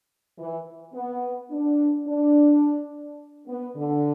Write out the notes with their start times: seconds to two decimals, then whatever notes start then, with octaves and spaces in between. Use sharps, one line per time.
0.38 E3
0.94 B3
1.50 D4
2.07 D4
3.48 B3
3.76 D3